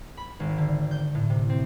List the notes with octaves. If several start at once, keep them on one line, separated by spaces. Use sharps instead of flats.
B5
G#1
D3
G6
A2
C3
C4